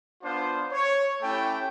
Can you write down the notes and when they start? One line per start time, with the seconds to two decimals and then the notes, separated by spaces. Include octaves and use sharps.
0.22 B3 D4 F4 C5
0.72 C#5
1.22 A3 C#4 E4 G4 G5